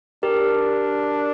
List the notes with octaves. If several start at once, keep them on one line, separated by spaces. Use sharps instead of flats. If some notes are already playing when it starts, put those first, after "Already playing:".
D4 G4 A#4